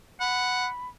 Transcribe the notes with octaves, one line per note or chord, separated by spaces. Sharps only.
F#5 B5